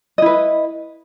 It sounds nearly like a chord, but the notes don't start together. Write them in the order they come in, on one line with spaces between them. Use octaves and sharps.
D#5 E4 B4